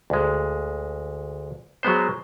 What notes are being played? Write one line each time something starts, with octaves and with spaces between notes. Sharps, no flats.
D2 G#3
F#3 G#3 B3 C5